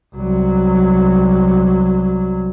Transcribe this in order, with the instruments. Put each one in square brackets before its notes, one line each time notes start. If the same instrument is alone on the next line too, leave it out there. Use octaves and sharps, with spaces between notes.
[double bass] C2 F#3